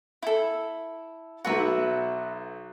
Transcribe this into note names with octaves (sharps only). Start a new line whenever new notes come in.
E4 A4
B1 F#3 F#4 B4 E5 F#5